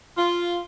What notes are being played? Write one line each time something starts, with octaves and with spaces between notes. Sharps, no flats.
F4